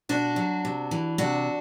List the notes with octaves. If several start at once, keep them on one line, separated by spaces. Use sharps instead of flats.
B2 D4 F#4
F#3
C3
E3
C3 D4 F#4